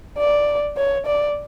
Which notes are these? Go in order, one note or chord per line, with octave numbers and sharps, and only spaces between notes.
D5
C#5
D5